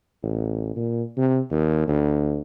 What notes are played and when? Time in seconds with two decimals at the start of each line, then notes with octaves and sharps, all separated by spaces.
0.23 A1
0.76 A#2
1.17 C3
1.51 D#2
1.87 D2